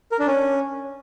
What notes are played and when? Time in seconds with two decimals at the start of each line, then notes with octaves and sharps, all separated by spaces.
0.12 A#4
0.19 D4
0.27 C#4